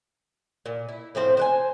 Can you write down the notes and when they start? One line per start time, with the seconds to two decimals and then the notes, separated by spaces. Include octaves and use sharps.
0.66 A#2
0.89 E4
1.15 A2 F3 C4 C5
1.37 C5 F#5 G#5